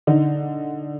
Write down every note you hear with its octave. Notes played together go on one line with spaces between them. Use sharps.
D3 D#4